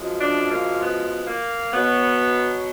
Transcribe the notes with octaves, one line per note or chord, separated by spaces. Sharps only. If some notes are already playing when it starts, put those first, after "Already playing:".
Already playing: F#2 F3 G#3
D4
A#3
B3
A#3
B2 F#3 B3